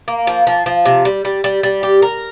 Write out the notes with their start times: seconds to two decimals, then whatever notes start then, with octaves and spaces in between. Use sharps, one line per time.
0.08 A#3
0.27 F3
0.47 F3
0.66 F3
0.85 C3
1.05 G3
1.25 G3
1.44 G3
1.63 G3
1.83 G4
2.02 A#4